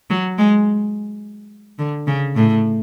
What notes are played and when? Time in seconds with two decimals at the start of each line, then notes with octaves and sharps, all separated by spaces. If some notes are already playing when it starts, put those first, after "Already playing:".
0.10 F#3
0.38 G#3
1.79 D3
2.07 C#3
2.36 A2